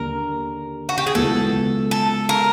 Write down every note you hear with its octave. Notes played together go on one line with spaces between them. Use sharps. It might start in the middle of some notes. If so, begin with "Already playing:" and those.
Already playing: D#2 D3 G3 A#3 A#4
F#4
G4
G#4
C#2 B2 F#3 B3 E4 A4
A4
A#4